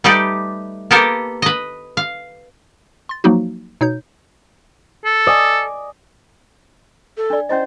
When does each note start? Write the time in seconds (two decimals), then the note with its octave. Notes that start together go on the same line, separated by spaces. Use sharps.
0.04 G3 A3 D#4 G4 B4 D5
0.91 A#3 B3 G4 A4 A#4
1.42 B4 D#5
1.97 F5
3.09 C6 A6
3.24 F3 F#3 A#3 D#4 F#4
3.81 B2 D#4 C#5 G6
5.05 A4
5.27 D5 D#5 G#5
7.17 A4
7.30 D4 D5
7.49 C#4 E4 C5 D#5